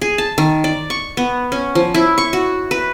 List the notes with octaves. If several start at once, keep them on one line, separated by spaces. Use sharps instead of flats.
G#4
A5
D#3
D5
C#6
B3
C#4
F3
E4
C#6
F#4
B4